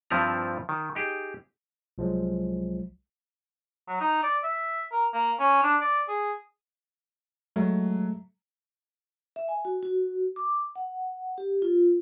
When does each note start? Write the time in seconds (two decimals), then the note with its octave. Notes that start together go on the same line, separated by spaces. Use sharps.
0.10 G2 F3 C4 E4 F4 A#5
0.69 D#3
0.95 D#4 G4 G#4
1.98 C2 F3 F#3 G#3
3.88 F#3
4.00 D#4
4.23 D5
4.44 E5
4.92 A#4
5.13 A#3
5.39 C#4
5.63 D4
5.81 D5
6.08 G#4
7.56 F#3 G#3 A3
9.36 E5
9.48 G#5
9.65 F#4
9.83 F#4
10.36 D6
10.76 F#5
11.38 G4
11.62 F4